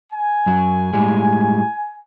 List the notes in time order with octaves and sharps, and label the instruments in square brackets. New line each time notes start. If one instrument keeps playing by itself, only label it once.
[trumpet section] G#5
[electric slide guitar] F#2 F#3
A2 G3 G#3